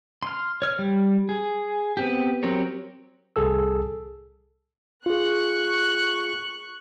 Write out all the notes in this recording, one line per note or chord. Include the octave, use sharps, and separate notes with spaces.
C6 F6
C#5 F6
G3
G#4
B3 C4 G4
F#3 C4 G4 A#4 C#5
C2 G#4 A4 E6
F4 G#4 C#6 F#6